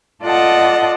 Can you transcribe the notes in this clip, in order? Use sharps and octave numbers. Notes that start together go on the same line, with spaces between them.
F4 A4 D5 D#5 F#5 A5